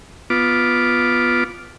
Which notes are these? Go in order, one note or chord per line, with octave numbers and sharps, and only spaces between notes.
B3 F4 D6